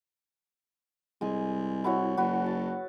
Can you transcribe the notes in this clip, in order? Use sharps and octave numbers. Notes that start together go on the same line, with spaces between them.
C2 G#3 G#5
E4 F#4 C#5
F#1 F#4 B4
A5